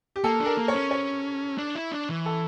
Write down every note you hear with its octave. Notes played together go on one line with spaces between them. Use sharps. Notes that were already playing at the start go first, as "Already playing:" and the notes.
G4
A#3 A4
D4
A#4
A#3
C#5
C#4
C#5
D4
E4
D4
E3
A4